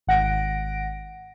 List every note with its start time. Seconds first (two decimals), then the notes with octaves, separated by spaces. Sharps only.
0.07 G#1 F#5 A#6 D7